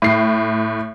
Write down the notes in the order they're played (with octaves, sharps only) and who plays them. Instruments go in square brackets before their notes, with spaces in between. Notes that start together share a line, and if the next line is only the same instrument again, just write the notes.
[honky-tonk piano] A2 C7